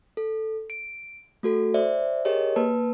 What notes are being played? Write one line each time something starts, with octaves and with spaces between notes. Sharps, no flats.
A4
D7
A3 F#4 A4
C5 D5 E5
G4 G#4 A#4 C#5 D#5
A#3 B4 A5